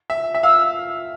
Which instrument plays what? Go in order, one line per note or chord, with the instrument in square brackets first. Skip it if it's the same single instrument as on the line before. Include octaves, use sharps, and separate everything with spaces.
[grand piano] E5
E5
[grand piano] F5 [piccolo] E6